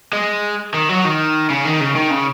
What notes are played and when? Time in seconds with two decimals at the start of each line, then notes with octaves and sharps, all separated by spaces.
0.13 G#3
0.74 D#3
0.89 F#3
1.05 D#3
1.50 C#3
1.65 D#3
1.80 C#3
1.96 D#3
2.11 C#3